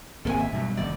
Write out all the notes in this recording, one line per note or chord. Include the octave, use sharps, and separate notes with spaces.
G#1 A#3 C4 A4 G#5
E5
G2 B2 F#3
F1 D#3 D5